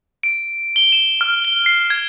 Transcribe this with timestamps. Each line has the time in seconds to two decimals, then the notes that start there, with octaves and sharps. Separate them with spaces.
0.23 D7
0.76 G7
0.93 E7
1.21 F6
1.45 G7
1.66 C7
1.90 G#6